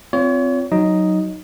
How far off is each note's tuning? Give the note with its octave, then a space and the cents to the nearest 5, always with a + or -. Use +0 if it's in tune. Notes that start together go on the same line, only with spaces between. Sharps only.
C4 -15 F4 +0 C#5 +35
F#3 +0 D#4 +0 D#5 +0